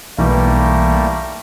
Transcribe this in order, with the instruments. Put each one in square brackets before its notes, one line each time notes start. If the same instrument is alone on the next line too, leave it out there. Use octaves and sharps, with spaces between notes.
[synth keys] B1 E3 [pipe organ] G3 A3 A#3